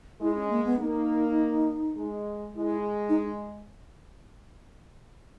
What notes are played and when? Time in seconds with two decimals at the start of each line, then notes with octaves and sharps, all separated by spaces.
0.20 G#3 E4
0.35 C#4
0.50 A#3
0.64 B3
0.78 A#3 D#4
1.96 G#3
2.55 G#3 E4
3.09 D#4